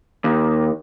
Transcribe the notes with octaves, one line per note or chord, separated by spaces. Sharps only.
D#2